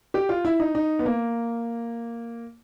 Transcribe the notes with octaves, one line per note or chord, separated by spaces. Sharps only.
G4
F4
E4
D#4
D#4
B3
A#3